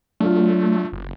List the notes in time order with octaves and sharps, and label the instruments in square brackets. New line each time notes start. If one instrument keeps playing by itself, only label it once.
[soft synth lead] F#3 [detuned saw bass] A3 [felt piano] D4 F4
[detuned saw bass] F#1